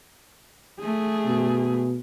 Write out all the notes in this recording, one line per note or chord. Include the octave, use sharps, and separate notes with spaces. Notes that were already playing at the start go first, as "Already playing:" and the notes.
A3 G#4
B2